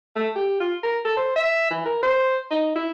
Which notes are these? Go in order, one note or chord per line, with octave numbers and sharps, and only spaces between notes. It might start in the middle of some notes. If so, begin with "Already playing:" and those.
A3
G4
F4
A#4
A4
C5
E5
E3
A#4
C5
D#4
E4